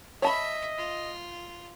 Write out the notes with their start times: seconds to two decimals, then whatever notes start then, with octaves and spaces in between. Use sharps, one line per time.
0.22 C#5 D#5 E5 A5 B5
0.77 F4